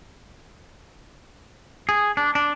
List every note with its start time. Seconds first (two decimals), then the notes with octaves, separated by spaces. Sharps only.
1.89 G#4
2.17 D4
2.35 D4